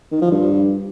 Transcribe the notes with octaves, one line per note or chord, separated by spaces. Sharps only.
D#3
F3
G2